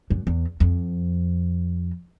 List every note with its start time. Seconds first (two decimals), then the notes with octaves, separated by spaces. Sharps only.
0.10 F#2
0.27 E2
0.60 F2